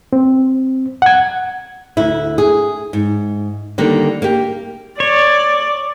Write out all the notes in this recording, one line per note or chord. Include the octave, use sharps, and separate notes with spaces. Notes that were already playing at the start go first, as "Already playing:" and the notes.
C4
F#5 G#6
D2 E4
G#4
G#2
D3 D#3 G3 A#3
A#3 G4
C#5 D5